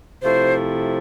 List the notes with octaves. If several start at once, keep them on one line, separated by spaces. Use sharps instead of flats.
C3 F3 A3 E4 C5